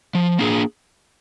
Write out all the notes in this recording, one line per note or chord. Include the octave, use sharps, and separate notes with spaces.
F3
A#3 D4 G#4